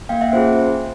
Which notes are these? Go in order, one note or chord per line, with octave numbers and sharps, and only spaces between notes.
A#3 F5 G5
E5 F#5
C#4 F4 G#4 C5